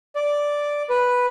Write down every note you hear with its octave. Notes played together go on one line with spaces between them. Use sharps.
D5
B4